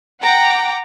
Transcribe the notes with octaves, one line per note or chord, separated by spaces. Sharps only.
F#5 G5 A#5 D6